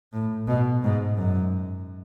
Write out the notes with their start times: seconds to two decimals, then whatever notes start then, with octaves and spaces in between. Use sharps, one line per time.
0.13 A2
0.48 B2
0.83 G#2
1.17 F#2